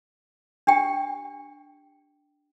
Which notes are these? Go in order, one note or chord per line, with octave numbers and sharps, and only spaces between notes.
D4 G4 G5